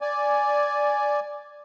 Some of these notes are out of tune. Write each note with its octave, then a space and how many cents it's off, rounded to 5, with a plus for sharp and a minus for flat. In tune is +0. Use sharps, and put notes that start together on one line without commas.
D5 -5 G#5 +0